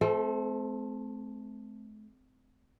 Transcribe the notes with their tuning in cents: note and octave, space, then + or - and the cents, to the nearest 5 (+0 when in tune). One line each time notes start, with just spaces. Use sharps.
A3 -45 C4 -20 A4 +0